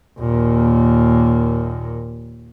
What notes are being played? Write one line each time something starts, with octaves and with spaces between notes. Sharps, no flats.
D#2 A#2